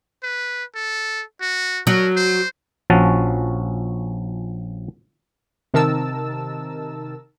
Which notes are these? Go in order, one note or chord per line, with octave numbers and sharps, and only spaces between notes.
B4
A4
F#4
F#3 A#4
C5
A#1 F3 C#4 F#4 A5
C3 D#3 D#4 A#4 A5 E6